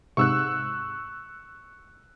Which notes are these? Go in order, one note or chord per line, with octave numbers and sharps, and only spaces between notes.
G#2 C3 C#6 E6 F#6